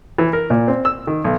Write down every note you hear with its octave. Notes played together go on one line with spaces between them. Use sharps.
E3
A#4
A#2
C4
E6
D#3
B1